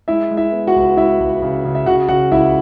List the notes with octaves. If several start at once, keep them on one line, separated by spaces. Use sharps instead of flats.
G#3 E4 E5
G#3
E4 E5
B3
F#4 F#5
C#2
G#3 E4 E5
C#2
C#3
C#3
E5
C#3 F#4 F#5
C#3 F#4 F#5
C#2 E4 E5